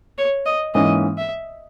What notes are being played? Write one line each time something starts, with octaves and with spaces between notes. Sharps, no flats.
C#5
D#5
G#2 E3 A#3 C#4 D#5
E5